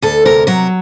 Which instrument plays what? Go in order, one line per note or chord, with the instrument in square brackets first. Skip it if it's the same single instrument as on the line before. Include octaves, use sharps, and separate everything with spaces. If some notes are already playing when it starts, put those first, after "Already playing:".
[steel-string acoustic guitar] D2 A4
C3 A#4
F#3 A#4